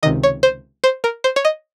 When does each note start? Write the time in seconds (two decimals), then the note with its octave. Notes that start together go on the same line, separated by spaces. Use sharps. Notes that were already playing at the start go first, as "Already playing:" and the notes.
0.03 C#2 C3 D#3 D#5
0.23 C#5
0.43 C5
0.84 C5
1.04 A#4
1.24 C5
1.36 C#5
1.45 D#5